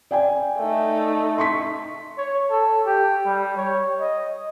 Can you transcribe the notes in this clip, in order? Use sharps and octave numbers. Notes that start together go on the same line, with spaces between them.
D5 G5 G#5
A3 D#4
C6 C#6 B6
C#5
A4
G4
G3
C#5
D#5